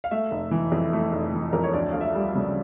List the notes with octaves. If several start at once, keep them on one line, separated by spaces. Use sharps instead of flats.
F5
A3 E5
F1
E3
F2
A3
F1
E3
F2 A#4
C#5
D2 D5
D2 F5
E5
G3
C#3